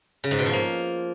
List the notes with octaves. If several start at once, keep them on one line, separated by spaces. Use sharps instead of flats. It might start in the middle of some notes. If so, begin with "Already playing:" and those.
C#3
G#2
B2
F3
A#3